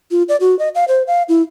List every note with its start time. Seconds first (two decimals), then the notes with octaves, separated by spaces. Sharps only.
0.11 F4
0.29 D5
0.41 F#4
0.59 D#5
0.75 F5
0.88 C5
1.07 F5
1.29 E4